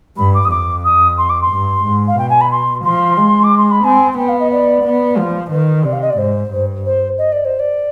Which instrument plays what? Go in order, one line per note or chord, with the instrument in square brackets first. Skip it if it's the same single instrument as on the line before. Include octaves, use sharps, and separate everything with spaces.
[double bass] G2 [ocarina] B5
[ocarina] D6
D#6
[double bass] F2 [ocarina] D6
[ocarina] D#6
C6
D6
C6
[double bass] G2
G#2
[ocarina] F5
[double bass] B2 [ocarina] G5
[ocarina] G#5
B5
C6
[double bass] F3 [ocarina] C6
[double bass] G#3
[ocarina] D6
C6
B5
[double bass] C4 [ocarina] G#5
[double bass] B3 [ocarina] G5
[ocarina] F5
D#5
D5
[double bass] B3
F3
[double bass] D#3 [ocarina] B4
[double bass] C3 [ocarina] D5
[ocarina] F5
D#5
D5
[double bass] G#2 [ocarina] C5
[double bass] G2
[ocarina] C5
D#5
D5
C5
D5